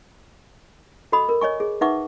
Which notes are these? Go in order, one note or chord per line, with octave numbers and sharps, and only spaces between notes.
F#4 A4 D#5 B5 D#6
A#4
C#5 D#5 G#5 C#6
G#4
D#4 B4 E5 F#5 C#6 D6